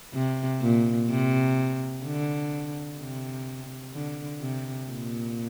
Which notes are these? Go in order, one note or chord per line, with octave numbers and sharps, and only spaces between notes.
C3
A#2
C3
D3
C3
D3
C3
A#2